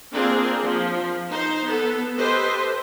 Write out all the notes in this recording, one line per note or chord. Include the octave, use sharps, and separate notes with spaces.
A#3 C4 D4 F4 G#4 A#4
F3
D#4 C5
B3 A4
G4 A4 B4 C5 D#5